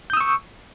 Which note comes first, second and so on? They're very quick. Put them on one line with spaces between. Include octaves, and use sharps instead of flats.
G6 D#6 E6 C#6